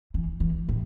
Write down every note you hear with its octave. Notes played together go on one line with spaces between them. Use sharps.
E3
E3
A2